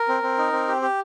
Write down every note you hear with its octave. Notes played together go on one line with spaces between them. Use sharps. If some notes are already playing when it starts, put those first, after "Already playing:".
Already playing: A#4
C4
C4
D#4
C4
G4
G4